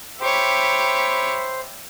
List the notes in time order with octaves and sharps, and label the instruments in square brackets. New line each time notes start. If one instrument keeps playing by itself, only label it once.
[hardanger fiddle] G4 C#5 [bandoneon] C5 [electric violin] E5 B5